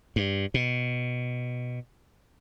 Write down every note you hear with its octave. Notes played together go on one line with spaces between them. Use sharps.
G2
B2